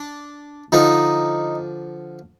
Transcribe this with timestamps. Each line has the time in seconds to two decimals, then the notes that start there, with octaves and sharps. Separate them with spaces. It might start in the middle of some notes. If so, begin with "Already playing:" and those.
Already playing: D4
0.72 D3 F3 D#4